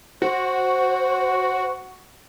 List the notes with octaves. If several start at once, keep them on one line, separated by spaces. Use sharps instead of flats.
F#4 C5